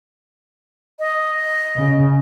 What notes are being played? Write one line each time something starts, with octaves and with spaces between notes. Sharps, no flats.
D#5
C#3